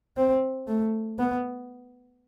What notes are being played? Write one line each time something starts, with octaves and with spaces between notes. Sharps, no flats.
C4
A3
B3